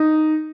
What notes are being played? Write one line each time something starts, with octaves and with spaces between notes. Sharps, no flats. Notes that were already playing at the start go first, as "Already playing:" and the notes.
Already playing: D#4